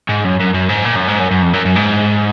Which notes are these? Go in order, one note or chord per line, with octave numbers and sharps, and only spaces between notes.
G#2
F#2
F#2
F#2
G#2
A#2
F#2
G#2
F#2
F#2
F2
F#2
F#2
G#2